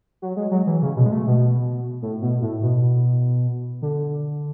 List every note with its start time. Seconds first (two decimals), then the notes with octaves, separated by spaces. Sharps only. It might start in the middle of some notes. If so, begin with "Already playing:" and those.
0.22 F#3
0.37 G#3
0.51 F#3
0.67 E3
0.82 C#3
0.97 B2
1.06 G#3
1.12 A3
1.27 B2
2.02 A2
2.22 B2
2.42 A2
2.62 B2
3.82 D3